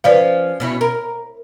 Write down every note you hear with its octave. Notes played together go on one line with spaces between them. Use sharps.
F3 C#4 B4 D5 F5
B2 C#4 E4
A#4